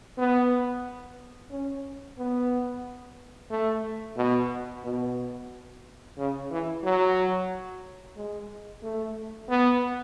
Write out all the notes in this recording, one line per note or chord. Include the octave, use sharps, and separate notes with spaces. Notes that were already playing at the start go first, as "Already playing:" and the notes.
B3
C#4
B3
A3
B2
B2
C#3
E3
F#3
G#3
A3
B3